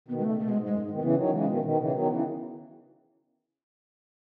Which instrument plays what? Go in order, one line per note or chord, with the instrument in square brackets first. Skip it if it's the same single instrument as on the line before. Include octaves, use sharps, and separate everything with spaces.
[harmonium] B2 D#3 [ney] B3
[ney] G#3
[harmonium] C#3 [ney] A3
[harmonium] C#3
[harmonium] B2 [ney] A3
[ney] G#3
[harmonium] G#2
[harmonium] F#2 [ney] G#3
[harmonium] G#2
B2 D#3
[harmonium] C#3 E3 [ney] B3
[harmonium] D#3 F#3
[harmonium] C#3 E3 [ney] G#3
[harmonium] B2 D#3
B2 D#3
C#3 E3
[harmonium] D#3 F#3 [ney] B3
[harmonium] C#3 E3